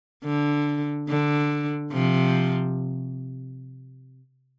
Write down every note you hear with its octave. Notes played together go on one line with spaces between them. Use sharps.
D3
D3
C3 F3